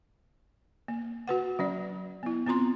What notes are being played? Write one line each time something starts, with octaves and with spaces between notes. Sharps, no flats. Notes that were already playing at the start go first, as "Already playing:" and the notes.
A#3
F#4 B4 F#5
F#3 C#4 D5
B3 E4
B3 C4 F4 A#5 C6